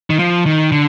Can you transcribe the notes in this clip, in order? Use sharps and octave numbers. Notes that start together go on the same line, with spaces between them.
D#3
F3
D#3
D3